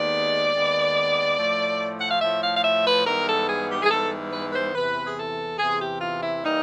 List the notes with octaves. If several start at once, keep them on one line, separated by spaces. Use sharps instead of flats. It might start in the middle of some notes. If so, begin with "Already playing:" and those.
Already playing: D#2 D#3 G#3 B3 D5
D#2 D#3 G#3 B3
A2 F3 A3
F#5
F5
A2 F3 A3 E5
F5
F5
E5
B4
G#2 E3 G3 B3 A#4
A4
G#4
G4
G#4
G#2 E3 G3 B3 A4
B4
B4
C5
E2 C3 E3 B4
G#4
A4
E2 C3 E3 G#4
G4
F4
E4
E3 G3 A#3 D#4